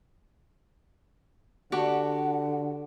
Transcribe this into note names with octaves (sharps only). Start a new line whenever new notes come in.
D3 D4 F#4 G4 F#5 C#6